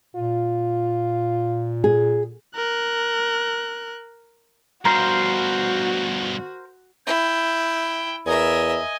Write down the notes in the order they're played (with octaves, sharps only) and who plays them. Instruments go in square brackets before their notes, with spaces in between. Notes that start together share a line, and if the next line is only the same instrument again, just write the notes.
[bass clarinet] A#2 [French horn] F4
[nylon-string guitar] G#4
[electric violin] A#4 F#6
[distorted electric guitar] G2 B2 [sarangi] F#4 [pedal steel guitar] A#4 C5 F5 [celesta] A#5
[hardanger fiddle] E4 [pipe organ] G5
[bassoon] E2 [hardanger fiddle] A#4 E5 [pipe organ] D#5 G#5